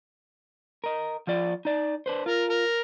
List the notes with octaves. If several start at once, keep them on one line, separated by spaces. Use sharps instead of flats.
A#4 D#5
F3 F4 D5
D#4 D5
D4 B4 C5
F4 A#4
A#4